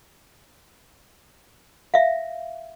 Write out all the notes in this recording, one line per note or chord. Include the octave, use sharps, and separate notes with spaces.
E5 F5